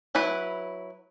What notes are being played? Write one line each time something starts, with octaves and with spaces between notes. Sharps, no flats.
F#3 E4 B4 B5